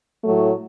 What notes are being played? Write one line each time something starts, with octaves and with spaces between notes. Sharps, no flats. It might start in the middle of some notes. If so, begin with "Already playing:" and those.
A2 F#3 A3